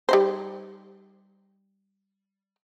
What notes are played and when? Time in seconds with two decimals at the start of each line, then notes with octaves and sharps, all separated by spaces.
0.09 G3 D#4 C5